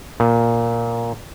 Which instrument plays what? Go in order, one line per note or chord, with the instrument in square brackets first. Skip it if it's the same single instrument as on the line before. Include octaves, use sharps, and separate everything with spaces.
[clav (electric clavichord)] A#2